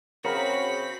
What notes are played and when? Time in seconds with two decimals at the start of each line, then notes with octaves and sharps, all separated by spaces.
0.25 C#3 C4 F#4 A#4 B5